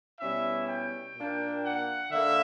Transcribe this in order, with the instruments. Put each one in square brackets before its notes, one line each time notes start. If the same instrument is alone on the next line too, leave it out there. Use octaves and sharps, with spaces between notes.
[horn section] B2 G3 C#4 E4 E5
G5
A#2 A#3 D4
F#5
D3 A#3 E5